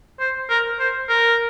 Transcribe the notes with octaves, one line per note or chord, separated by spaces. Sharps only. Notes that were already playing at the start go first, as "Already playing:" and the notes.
C5
A#4
C5
A#4